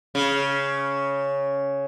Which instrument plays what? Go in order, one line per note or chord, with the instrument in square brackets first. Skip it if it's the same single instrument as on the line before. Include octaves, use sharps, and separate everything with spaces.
[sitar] C#3